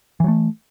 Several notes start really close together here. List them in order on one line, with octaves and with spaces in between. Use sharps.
E3 F#3 A3